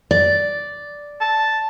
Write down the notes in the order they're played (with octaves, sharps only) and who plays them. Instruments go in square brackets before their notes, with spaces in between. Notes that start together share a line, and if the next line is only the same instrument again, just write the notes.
[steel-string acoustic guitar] D5
[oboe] A5